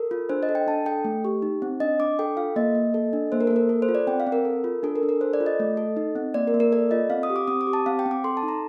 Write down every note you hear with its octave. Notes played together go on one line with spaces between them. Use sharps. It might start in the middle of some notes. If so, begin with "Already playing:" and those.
Already playing: A4 A#4
F4
D4 C5
D#5
A4
G5
D4 A5
A4 G5
A3
G4
D#4
C4
D4 D#5
D4 D6
A4 G5
F4 F5
A#3 D#5
A#3
A4
D4
A#3 C5
A#4
A4
A#3
A#4
A4
C5
F4
D5
C4 G5
F5
C4
A#4
A4
F4
D4 A4
A#4
D4
A#4
A4 C5
D5
F4
D#5
A3
A4
D#4
C4
A#3 D5
A#4
A#3
A#4
A4 D5
F4 D#5
C4 F5
D#6
G4
D6
C4 D#6
D6
G4
A5
C4 F5
G5
C4
D6
A4 C6
A5
D#4
A#5